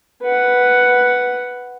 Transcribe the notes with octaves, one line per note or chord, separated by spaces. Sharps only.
B4 F#5